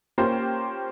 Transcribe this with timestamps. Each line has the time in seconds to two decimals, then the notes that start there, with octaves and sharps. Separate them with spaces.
0.18 A#3 C#4 F4 G4 C5